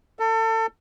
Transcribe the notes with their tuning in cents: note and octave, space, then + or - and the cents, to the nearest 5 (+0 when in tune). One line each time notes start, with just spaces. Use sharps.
A4 +30